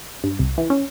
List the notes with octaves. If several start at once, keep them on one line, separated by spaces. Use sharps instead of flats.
G2
C2
E3
C#4